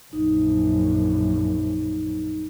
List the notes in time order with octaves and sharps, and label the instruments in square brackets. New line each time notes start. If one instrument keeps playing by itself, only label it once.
[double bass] A#1 F#2 [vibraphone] D#4